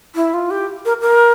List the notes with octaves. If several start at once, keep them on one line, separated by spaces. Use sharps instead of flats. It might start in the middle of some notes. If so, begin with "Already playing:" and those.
E4
F4
G4
A#4
A#4